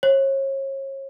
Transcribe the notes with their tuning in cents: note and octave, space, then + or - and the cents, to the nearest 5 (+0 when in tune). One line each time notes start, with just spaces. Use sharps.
C#5 -35